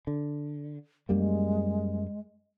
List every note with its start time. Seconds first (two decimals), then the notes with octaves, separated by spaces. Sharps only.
0.07 D3
1.09 F#2 G3 G#3 A#3